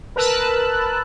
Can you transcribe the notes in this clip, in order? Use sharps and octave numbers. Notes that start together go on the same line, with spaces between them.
A#4 B4 A5 E6 F#6